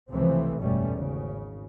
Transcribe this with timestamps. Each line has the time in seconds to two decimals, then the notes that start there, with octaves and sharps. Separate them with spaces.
0.11 C#2 C3 E3 F3 A3 C4
0.61 F#1 E2 B2 G3 A3 C#4
0.92 G#1 C#3